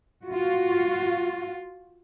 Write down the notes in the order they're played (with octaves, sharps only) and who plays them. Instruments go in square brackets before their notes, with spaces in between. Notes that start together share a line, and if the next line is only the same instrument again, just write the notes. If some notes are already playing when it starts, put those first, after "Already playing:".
[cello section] F4 F#4